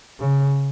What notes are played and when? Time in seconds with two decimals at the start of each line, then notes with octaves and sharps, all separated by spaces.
0.20 C#3